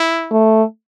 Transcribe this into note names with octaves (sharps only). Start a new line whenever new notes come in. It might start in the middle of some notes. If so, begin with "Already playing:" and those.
Already playing: E4
A3